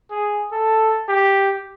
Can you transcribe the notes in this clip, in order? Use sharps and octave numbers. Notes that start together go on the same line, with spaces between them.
G#4
A4
G4